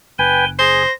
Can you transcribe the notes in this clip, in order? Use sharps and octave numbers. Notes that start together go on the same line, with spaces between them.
F#1 B4 G5 G#5 G7
G#4 C5 A#6